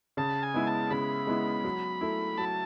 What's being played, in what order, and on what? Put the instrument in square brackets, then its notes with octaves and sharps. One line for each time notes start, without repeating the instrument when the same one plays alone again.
[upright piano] C#3 [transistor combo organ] A5
[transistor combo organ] G#5
[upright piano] G#3 B3 E4
[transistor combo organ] A5
[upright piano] C#3 [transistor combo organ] B5
[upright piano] G#3 B3 E4
F#3
A3 E4
[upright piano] F#3 [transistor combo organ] A5